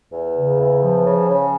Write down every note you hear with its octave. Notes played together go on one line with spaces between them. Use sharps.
E2
C#3
E2
F3
C#3
C#3